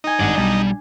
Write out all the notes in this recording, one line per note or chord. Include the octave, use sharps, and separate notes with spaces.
D#4 D#5 G#5
G#1 G2 D4 D5 F#5
B1 G3 A5